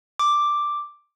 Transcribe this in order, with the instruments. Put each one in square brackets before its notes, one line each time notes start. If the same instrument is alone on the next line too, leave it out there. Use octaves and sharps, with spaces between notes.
[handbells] D6